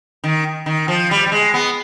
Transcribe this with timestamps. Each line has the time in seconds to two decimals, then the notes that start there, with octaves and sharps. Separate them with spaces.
0.24 D#3
0.66 D#3
0.88 F3
1.11 G3
1.26 G3
1.32 G#3
1.54 B3